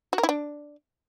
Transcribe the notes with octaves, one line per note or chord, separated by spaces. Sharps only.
F#4
A#4
E4
D4